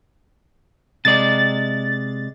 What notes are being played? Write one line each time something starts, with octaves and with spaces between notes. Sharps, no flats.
C3 G#3 D5 A6